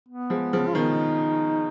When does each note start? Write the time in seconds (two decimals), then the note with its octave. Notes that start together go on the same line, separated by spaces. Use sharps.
0.09 B3
0.30 F3 G#3
0.53 C#3 F3
0.68 F4
0.74 B2 D#3 D#4